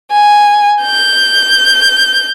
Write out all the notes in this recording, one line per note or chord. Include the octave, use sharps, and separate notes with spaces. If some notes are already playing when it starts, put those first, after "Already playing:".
G#5
G6